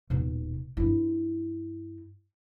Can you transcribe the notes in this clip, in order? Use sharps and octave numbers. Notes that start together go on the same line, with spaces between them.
D#1 B2
G2 E4